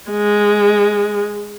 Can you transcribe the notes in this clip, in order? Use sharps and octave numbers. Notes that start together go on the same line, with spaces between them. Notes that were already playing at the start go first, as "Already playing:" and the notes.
G#3